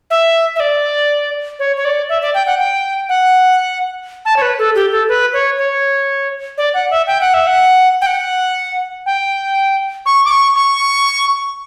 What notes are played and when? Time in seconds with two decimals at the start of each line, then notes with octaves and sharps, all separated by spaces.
0.10 E5
0.56 E5
0.60 D5
1.59 C#5
1.76 C#5
1.85 D5
2.09 E5
2.22 D5
2.34 G5
2.46 F#5
2.59 G5
3.09 F#5
4.25 A5
4.36 C#5
4.42 B4
4.59 A4
4.75 G4
4.92 A4
5.08 B4
5.33 C#5
5.58 C#5
6.58 D5
6.74 F#5
6.91 E5
7.07 G5
7.21 F#5
7.34 E5
7.47 F#5
8.02 G5
8.06 F#5
9.06 G5
10.06 C#6
10.25 D6
10.31 C#6
10.56 C#6